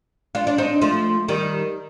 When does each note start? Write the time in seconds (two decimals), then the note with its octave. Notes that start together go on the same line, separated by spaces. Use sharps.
0.35 D4 F4
0.47 D4
0.58 C4 D#4
0.82 F3 A3
1.28 D#3 G3